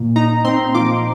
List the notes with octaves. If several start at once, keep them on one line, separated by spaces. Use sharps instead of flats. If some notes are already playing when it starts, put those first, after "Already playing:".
Already playing: A#2
D#4 A#5
C4 C6
F3 D6